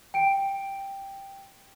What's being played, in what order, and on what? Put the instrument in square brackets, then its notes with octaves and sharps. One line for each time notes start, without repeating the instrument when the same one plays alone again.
[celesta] G5 D7